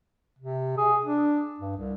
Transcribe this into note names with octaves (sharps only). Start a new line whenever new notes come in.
C3
G#4
D4
G2
C2